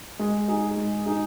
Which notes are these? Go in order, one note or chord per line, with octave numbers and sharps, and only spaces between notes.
G#3
D#4 G#4
G#3
D#4 G#4